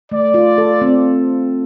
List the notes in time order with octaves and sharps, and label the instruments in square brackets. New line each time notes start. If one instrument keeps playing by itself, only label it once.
[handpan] A3 [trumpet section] D5
[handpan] F4
A4
C4